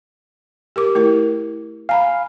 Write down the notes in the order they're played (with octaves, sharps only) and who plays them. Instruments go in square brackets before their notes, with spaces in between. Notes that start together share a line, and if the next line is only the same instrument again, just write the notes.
[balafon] G4 A#4 D6
A3 E4 A#4
[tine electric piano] F5 [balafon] G#5 A#5 B5